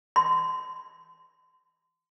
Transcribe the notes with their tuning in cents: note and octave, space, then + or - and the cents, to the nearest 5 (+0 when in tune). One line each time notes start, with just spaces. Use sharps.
C6 -35